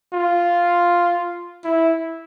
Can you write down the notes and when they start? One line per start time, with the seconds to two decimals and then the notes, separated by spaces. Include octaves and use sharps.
0.13 F4
1.64 E4